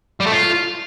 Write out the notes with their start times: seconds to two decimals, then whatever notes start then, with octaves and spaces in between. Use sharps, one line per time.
0.20 G3
0.26 A3
0.32 F4